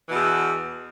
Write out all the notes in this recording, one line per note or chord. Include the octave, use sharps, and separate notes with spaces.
E2 B2 E3